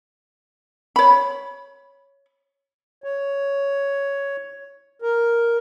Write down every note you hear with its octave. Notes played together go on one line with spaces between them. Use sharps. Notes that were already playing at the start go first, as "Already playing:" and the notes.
C#5 B5
C#5
A#4